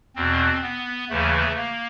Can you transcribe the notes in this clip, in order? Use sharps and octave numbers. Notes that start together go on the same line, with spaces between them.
E2 B2 C4
B3
D#2 C#3 E3 A3
A#3